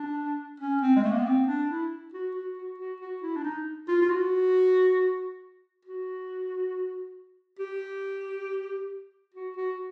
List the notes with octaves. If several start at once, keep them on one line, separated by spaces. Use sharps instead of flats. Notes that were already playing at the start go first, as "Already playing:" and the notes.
Already playing: D4
C#4
C4
G#3
A3
A#3
B3
C4
D4
E4
F#4
F#4
F#4
F#4
F#4
E4
D4
D#4
F4
F4
F#4
F#4
G4
F#4
F#4